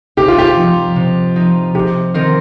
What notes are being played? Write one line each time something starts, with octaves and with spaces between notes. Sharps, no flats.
C3 G4
F4
G4
F3 D#4
C3
F3 D#4
C3 G4
D#3 C4 F4 A#4